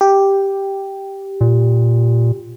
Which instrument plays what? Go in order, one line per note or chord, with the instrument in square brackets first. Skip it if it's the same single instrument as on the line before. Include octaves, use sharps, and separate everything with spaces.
[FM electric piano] G4
[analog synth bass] A#2